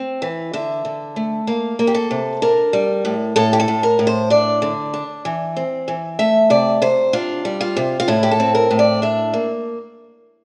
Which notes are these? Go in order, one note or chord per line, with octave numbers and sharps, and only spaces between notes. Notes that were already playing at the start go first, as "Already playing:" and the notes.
Already playing: C4
E3
D3 E5
D3
A3
A#3 F5
A#3
G4
A4
C3
D4 A#4
G3
A2
A2 A4
G4
A4
A2
A#4
A2
C5
D4 D5
D3
D4
E3
C4
E3
A3 E5
C3 D5
C3 C5
D4 F4
G3
F4
C3
F4
A2 E4
G4
A4
C4
A#4
A2
D5
D4 E5
A#3